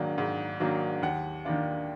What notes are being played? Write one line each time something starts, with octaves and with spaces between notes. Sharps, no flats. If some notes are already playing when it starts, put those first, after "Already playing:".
Already playing: G#2 D#3 F#3 A#3 D4
G#2
D#3 F#3 A#3 D4
D#2 F#5
D#3 A#3 D4 F4